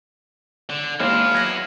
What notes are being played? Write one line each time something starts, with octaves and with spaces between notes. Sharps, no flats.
D3
D#2 G#3 B3 C4 D4 E4 F5
F#3 G#6 A#6